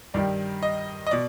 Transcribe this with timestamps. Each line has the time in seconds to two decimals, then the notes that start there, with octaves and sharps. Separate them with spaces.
0.14 G2 D#3 G3 D5
0.63 D#5
1.07 D#5
1.11 B2 D5